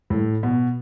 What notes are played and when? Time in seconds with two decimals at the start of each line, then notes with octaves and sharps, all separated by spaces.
0.10 A2
0.43 B2